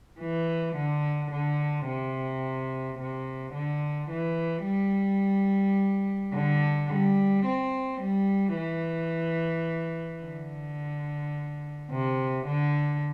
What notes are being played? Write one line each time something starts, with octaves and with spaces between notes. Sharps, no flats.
E3
D3
D3
C3
C3
D3
E3
G3
D3
G3
C4
G3
E3
D3
C3
D3